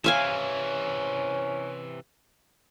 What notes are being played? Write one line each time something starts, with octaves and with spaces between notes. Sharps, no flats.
C3 E3 C#4 E5 F5 G#5